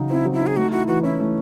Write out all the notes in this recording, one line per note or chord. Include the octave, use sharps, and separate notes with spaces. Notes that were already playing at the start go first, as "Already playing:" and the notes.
Already playing: C#3 F#3 D#4
C4 E4
F#3
E4
D#4
G#4
A3 F#4
E4 F#4
E3 F#4
C#4 E4
A3